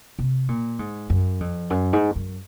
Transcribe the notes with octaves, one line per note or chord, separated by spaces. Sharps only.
C3
A#2
G#2
F#2
F2
F#2
G#2
F#2